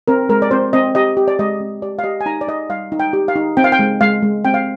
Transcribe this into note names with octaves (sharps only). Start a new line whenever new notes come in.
C4 A#4
G#3 A#4
D5
C4 C5
C4 D#5
G4 D#5
G4
D5
G#3 D#5
C4
G4 D5
F5
G4 D#5
G#5
D#4 A#5
D5
D#4 D#5
G3 F5
D#4
G5
G4
F5
D#4
C4 G5
F5
G5
G#3
G#3 F5
G#3
C4 G5
F5